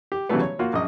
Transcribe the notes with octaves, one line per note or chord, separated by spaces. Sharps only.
G4
C#3 E3 F#3 G3 A3 B3
C#5
A#3 F4 F#4
A#1 F#2 D#5